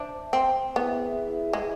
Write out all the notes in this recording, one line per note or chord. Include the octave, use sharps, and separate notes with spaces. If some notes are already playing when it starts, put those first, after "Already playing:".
Already playing: D4 C5 E5 A5
C4
B3 E4 G#4 B4 E5
G#3